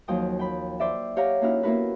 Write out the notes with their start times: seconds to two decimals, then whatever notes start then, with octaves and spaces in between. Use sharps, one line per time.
0.08 D#2 F3 F#3 G5 D#6
0.39 G5 B5
0.80 C5 D5 E5
1.16 G4 C#5 F5 F#5 A#5
1.41 A#3 C#4 D#4 E4 F#4 F6
1.63 A#3 B3 E4 F#4 A#4 B4